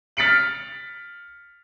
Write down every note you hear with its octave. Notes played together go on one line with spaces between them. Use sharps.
F6 A6 B6 C#7 D7 F#7